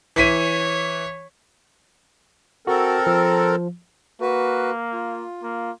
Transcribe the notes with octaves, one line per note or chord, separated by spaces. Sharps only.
E3 C#5 B6 D#7
C4 F#4 A4 A#4
F3
A#3 F#4 B4
F4
A#3